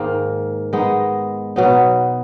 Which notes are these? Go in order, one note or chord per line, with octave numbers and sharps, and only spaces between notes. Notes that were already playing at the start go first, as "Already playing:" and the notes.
Already playing: G#2 D#3 A#3
G#3 B3 D#4
B2 F#3 B3 D#4